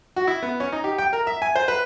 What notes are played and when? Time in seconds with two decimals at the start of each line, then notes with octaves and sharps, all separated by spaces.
0.16 F#4
0.27 E4
0.43 B3
0.60 C#4
0.72 D#4
0.84 G4
0.98 G5
1.13 A#4
1.27 E5
1.42 G#5
1.56 C5
1.68 B4